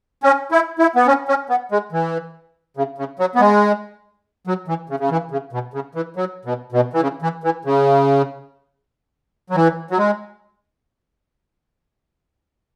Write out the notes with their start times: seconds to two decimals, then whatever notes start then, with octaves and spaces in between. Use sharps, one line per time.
0.23 C#4
0.52 E4
0.79 E4
0.96 B3
1.07 C#4
1.28 C#4
1.49 B3
1.72 G#3
1.92 E3
2.77 C#3
2.98 C#3
3.19 F#3
3.35 B3
3.40 G#3
4.47 F#3
4.68 E3
4.90 C#3
5.00 C#3
5.11 E3
5.31 C#3
5.53 B2
5.74 C#3
5.95 E3
6.16 F#3
6.45 B2
6.72 B2
6.93 E3
7.02 C#3
7.22 E3
7.44 E3
7.65 C#3
9.50 F#3
9.55 E3
9.91 F#3
9.98 G#3